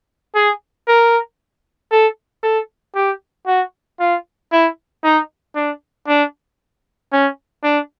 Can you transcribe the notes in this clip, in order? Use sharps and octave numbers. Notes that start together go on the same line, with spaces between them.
G#4
A#4
A4
A4
G4
F#4
F4
E4
D#4
D4
D4
C#4
D4